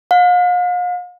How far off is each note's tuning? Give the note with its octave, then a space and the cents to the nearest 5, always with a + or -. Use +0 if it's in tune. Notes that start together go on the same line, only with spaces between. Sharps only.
F5 +45